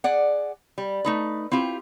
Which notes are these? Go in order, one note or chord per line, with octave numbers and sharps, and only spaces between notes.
G#4 D5 F#5
G3
A3 D#4 B4
C4 E4 F4 G4